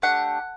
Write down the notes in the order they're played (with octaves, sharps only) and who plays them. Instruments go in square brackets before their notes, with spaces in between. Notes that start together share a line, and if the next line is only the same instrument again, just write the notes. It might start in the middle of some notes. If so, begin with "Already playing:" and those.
[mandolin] A3 D4 G4 F#5